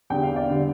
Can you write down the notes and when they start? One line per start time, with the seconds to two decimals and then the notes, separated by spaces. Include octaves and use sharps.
0.10 E2 D3 G3 G5
0.23 F5
0.36 D5
0.50 D3 G3